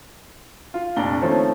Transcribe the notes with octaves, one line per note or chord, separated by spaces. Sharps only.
F4
F1 A#2 D4 A#5 G7
D#3 F3 A3 C4 C#4